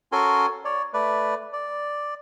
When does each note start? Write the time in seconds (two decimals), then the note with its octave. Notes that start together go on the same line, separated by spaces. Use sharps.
0.12 C#4 F#4 A4 A#4 G#5 C6
0.65 C#5 D5
0.94 A3 B4 D5
1.53 D5